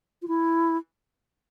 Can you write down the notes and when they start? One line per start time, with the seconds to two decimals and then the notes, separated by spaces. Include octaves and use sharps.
0.22 F4
0.28 E4